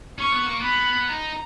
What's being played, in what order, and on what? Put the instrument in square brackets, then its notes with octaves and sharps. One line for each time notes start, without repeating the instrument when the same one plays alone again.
[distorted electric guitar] C#4 [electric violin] C#6
[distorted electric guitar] B3
A#3
[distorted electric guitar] B3 [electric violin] B5
[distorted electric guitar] D#4 [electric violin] A#5